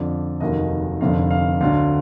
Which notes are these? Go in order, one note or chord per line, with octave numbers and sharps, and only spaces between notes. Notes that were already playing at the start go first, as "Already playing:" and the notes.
Already playing: F2 D3 F3 D5
F1 D#2 D#3 F#3 D#5
F1 F2 D3 F5
F5
D2 D3 F#3 F5